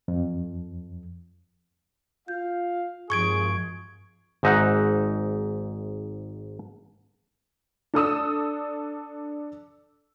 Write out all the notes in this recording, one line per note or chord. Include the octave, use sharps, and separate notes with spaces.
F2
F4 F5 G6
G#1 G2 F3 F4 G#4 C#6 G#6 D7
G#1 G#2 D#4 E5 F#5
D4 A4 D#6 E6